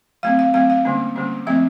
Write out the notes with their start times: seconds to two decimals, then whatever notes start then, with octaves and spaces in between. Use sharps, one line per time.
0.23 F#3 A3 C4 F5
0.39 F5
0.54 F#3 A3 C4 F5
0.70 F5
0.85 D3 G3 A#3 C#4
1.16 D3 G3 A#3 C#4
1.46 F3 A3 C4 E5